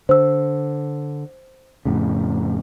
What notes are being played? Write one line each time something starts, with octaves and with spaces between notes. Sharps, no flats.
D3 C5 E6
F2 A2 C#3